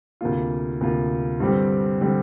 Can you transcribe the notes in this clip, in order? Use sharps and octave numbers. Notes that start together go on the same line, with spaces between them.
D2 C3 A#3 F4
D2 C3 A#3 F4
G2 D3 G3 C4 G4
D3 G3 C4 G4